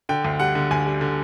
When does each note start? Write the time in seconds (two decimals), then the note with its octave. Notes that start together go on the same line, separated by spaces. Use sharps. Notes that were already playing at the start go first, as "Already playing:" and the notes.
0.09 D3 G5
0.24 D2
0.40 G3 F#5
0.55 D3
0.71 D2 G#5
0.86 G3
1.01 D3